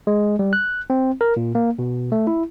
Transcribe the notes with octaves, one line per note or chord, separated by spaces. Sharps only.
G#3
G3
F#6
C4
A#4
A#2
A#3
B2
A3
E4